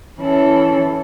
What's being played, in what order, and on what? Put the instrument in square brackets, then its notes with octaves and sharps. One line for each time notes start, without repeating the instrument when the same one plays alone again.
[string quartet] E3 C#4 E4 A4